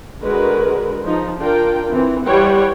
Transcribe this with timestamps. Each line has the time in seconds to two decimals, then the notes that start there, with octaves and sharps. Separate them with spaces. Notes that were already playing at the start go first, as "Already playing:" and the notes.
0.22 D3 G#3 F#4 A#4 B4
1.04 F3 D#4
1.38 D4 F4 A#4 G5
1.90 E3 C4
2.25 E3 G3 C5 C#5 F#5 G5